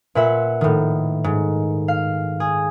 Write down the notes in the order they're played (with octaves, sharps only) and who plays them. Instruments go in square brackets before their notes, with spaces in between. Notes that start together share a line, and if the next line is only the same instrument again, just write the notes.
[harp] A#2 B4 E5 F#5
A2 D#3
G#2
F5
G#4